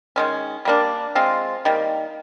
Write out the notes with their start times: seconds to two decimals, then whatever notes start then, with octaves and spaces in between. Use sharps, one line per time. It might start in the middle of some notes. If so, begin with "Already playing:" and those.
0.16 D#3 G#3 C#4
0.65 G3 A#3 D4
1.15 G#3 C4 F4
1.65 D#3 G3 A#3